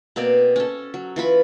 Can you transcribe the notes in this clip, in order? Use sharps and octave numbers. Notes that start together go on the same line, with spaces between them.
B2 A#3 C4 D5
C#4 A4
F#3
E3 F4 B5 C#6